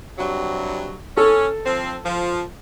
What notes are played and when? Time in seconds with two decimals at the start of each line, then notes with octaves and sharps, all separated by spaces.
0.19 G2 C3 F#3
1.17 C#4 A4
1.66 F3 C4
2.05 F3